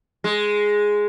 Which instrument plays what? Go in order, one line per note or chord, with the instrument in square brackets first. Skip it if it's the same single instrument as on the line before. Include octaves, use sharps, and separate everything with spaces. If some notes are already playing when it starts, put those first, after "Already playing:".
[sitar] G#3